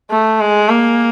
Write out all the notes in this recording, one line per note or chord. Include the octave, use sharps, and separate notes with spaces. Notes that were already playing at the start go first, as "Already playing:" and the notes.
A3
G#3
A#3